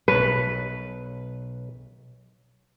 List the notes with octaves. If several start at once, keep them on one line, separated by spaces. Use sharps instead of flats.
B1 B4 C#5 A5